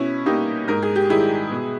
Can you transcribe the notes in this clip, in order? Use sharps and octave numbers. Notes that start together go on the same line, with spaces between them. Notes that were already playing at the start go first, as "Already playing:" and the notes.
Already playing: B2 C#4 E4
G3 A#3 D#4 G4
G#2 A#4
G#4
G4
D#3 G3 E4 G#4
B2